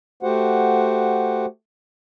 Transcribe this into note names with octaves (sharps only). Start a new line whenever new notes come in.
A3 F#4 G4 C5 F#5